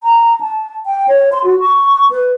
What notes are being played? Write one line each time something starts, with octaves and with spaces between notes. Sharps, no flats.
A#5
A5
G5
C#5
C6
F#4
C#6
B4